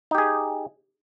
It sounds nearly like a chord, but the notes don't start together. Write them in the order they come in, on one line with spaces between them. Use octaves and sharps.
D#4 G4 G#4